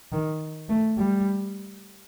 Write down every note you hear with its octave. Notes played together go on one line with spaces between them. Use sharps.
D#3
A3
G3